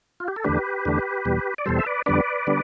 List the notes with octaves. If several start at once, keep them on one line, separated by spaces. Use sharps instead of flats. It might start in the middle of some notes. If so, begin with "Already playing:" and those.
F4
G4
A4
E2 D3 A3 D4 G4 B4
E2 D3 A3 D4
E2 B2 G3
D5
E2 B2 G3 A4 C5
E5
B4 D5
F2 D3 G3 B3 D4 B4 D5
D3 G3 B3 D4